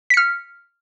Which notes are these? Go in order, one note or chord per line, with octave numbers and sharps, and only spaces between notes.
F6 B6 C#7